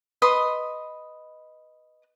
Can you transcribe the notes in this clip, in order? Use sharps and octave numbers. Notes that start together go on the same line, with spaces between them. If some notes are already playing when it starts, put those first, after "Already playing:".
B4 D#5 C6 D#6